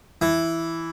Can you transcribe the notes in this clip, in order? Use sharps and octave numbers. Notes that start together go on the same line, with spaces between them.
E3